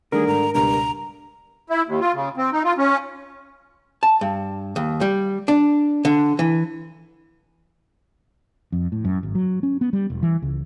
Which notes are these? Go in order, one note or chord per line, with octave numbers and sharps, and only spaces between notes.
D3 D#3 G3 A3 G#4 A#4
G#2 A#5
C#2 G2 B2 A#5
E4
D#2
F4
C#3
C4
D#4
F4
C#4
A5
G2
D#2
G3
D4
D3
E3
F2
A2
F#2
G#1
F#3
C#4
B3
G3
E1
E3
C#2